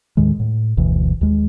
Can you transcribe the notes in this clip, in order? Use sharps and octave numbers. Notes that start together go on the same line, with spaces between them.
D#2 A2 D#3 G#3
A2
F#1 D2 B2 E3
D#2 G#3